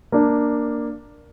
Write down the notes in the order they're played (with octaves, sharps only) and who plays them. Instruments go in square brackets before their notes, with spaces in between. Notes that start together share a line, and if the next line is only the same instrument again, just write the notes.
[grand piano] A#3 D4